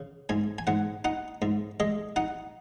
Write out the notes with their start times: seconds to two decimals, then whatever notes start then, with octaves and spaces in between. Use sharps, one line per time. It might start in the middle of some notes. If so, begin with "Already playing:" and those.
Already playing: C#3
0.29 G#2 G#5
0.58 G#5
0.67 G#2 F#5
1.05 D#4 F#5
1.42 G#2
1.80 G#3 D#5
2.16 D#4 F#5